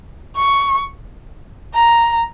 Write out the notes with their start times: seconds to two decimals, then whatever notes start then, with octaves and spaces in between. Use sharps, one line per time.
0.36 C#6
1.74 A#5